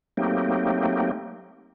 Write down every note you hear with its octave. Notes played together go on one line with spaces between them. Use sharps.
F#3 A3 A#3 C4 D#4 G4